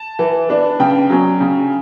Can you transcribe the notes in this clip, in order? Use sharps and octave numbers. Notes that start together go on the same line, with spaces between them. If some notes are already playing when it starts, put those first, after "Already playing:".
Already playing: A5
E3
B3 D4
C#3 G5
F#3 C#4
C#3